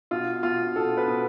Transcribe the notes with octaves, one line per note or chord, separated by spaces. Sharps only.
B2 F4
B2 F4
B2 A4
B4
B2